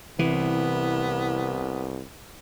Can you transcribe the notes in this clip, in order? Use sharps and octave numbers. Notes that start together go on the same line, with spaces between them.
C2 C3 E3 B3